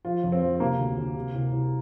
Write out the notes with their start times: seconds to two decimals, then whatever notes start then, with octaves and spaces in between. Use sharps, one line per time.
0.05 F3 F4
0.23 F2
0.32 C4
0.42 F3
0.56 C4
0.60 C3 A#3
0.79 D2
0.98 D2
1.15 C3
1.34 C2
1.52 C2